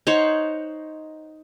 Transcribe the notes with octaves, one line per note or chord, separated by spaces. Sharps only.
D#4 C5 C#5 F#5